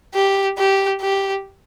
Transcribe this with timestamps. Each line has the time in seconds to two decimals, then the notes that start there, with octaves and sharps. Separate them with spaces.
0.14 G4
0.58 G4
1.01 G4